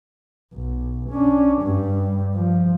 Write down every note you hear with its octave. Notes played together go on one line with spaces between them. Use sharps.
B1
C#4 D4
G2 G3
F3